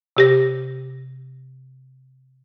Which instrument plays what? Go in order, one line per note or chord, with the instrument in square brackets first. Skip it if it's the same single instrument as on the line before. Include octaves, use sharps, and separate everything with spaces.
[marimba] C3 G4 A#6